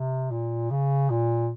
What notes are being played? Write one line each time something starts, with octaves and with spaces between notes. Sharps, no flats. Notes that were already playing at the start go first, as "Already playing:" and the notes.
Already playing: C3
A#2
C#3
A#2